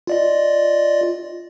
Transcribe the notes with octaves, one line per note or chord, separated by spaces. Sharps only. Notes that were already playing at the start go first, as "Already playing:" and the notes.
F4 D5 D#5